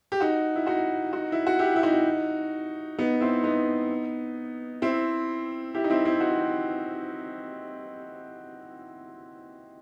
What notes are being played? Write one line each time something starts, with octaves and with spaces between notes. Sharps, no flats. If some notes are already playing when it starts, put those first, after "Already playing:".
G4
D#4 F#4
E4
D#4 F#4
D#4 F#4
E4
F#4
E4 G4
E4
D#4 F#4
B3 D#4
C4 E4
B3 D#4
C4 E4
E4 G4
D#4
C4 E4
C4 E4
D#4 F#4